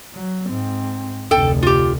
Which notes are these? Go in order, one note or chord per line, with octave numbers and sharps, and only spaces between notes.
F#3
G#2 C4
F1 D2 A4 G5
F4 G4